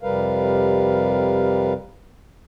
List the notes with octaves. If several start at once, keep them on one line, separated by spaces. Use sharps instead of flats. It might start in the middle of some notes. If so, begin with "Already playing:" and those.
F2 C3 G3 A#4 B4 F5